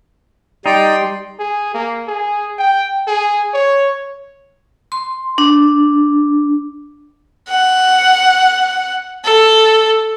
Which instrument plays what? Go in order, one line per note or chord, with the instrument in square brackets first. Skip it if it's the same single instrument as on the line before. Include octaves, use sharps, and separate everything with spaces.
[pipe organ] G3 C6 [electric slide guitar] D#4 [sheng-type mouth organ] D5 [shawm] G5
[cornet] G#4
A#3
G#4
G5
G#4
C#5
[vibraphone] C6
D4
[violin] F#5
A4